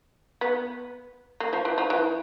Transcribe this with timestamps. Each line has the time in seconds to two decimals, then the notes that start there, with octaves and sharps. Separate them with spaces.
0.41 B3
1.40 A#3
1.53 F3
1.65 E3
1.78 F3
1.90 E3